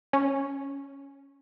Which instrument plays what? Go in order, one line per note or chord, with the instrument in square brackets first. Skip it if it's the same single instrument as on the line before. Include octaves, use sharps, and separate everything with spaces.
[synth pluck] C#4